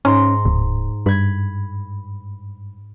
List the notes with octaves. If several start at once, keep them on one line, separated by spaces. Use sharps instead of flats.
G#2 C#4 A#5 C6
D1
G2 B5 G#6